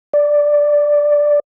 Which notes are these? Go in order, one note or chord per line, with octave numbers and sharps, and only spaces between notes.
D5